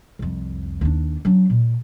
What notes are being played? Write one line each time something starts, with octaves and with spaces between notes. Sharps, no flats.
C2 F2
D#2 D4
F#3 D4
A#2